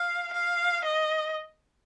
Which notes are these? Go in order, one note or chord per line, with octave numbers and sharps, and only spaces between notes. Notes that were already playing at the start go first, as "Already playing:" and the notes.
Already playing: F5
F5
D#5